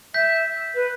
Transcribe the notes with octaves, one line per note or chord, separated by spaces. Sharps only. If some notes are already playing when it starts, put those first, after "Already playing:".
E5 G6 B6
B4